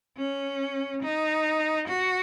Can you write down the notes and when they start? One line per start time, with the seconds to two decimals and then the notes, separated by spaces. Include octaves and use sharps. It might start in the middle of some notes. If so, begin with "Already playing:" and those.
0.18 C#4
1.03 D#4
1.88 F#4